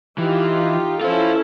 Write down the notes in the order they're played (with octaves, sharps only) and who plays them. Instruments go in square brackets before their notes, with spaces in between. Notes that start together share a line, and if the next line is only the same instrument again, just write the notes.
[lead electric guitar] E3 [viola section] D#4 F4 G4
[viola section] C#4 E4 A4 [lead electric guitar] F4 C5